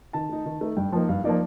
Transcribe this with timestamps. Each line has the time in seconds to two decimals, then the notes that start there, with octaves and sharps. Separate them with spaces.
0.13 D#3 A5
0.29 A3 D#4
0.45 D#3
0.61 A3 D#4
0.77 G2 G5
0.92 F3 A#3 D#4
1.09 G2 F5
1.24 F3 A#3 D#4 D5